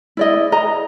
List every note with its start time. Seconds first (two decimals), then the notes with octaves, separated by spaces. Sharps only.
0.17 E4 D5 D#5
0.52 D#5 A#5